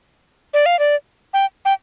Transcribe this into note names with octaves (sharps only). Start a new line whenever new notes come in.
D5
F5
D5
G5
G5